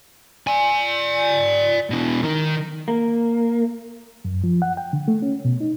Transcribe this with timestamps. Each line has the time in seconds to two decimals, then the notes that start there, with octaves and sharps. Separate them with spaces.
0.47 D5 G#5
1.90 B2 E3
2.23 D#3
2.88 A#3
4.25 F#2
4.44 F3
4.62 F#5
4.77 G5
4.93 D3
5.08 A3
5.22 C#4
5.45 B2
5.61 D#4